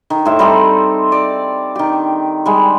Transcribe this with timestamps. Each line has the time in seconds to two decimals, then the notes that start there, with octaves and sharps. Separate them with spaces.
0.10 D#3
0.25 A2 C5 E5
0.39 G3 C4 D#4 A4
1.12 D5
1.76 D#3 G4
2.46 G3 G#3 G#5